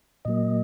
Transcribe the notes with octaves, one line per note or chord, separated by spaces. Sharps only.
A#2 F#3 A#3 D#5